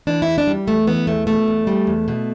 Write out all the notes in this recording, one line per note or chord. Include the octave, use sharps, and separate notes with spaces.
E3 D4
E4
E2
D4
G3
E2 A3
E3 B3
E2 A3
B2 A3
E2
G3
E2
B2